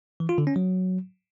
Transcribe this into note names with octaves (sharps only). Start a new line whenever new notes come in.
E3
F4
D3
C#4
F#3